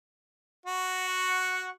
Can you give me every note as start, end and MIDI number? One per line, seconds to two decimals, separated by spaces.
0.66 1.70 66
1.07 1.69 78
1.07 1.69 85